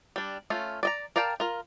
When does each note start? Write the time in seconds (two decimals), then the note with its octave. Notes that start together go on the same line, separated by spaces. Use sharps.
0.16 G3 D4
0.50 A3 C#4 F4
0.83 D5 D#5 A#5
1.16 A#4 D5 F5 G5 A5
1.40 F4 A#4